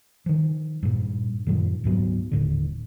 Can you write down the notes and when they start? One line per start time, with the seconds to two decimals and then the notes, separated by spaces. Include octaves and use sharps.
0.26 D#3 F3
0.83 G2 A#2
1.47 F#2 A#2 D#3 F3
1.84 D1 G#2 F#3 B3
2.32 D#1 A2 D3